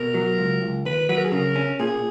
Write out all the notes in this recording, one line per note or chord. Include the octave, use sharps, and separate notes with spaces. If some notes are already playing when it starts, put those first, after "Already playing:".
Already playing: B2 A#4
F#3
C#2
C#2
D#2 B4
F#3 B4
A#4
G#4
C#3 A#4
C#4
A#2 G#4